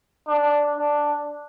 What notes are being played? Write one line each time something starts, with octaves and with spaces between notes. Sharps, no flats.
D4
D4